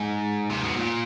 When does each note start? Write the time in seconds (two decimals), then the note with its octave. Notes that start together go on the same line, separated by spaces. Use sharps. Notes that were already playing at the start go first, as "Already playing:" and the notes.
Already playing: G#2
0.50 C3
0.63 B2
0.76 A#2